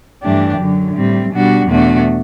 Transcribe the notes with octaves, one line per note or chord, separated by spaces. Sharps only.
G2 E3 A3 D4 G4
F#2 D3 F#3
A2 G3 C4
B2 G3 D4 F#4
E2 B2 A3 D4 F#4